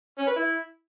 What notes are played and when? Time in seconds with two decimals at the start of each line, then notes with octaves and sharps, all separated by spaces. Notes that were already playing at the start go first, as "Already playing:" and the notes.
0.18 C#4
0.27 B4
0.36 E4